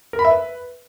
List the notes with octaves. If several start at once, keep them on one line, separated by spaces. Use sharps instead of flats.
A#4
B5
E5
B4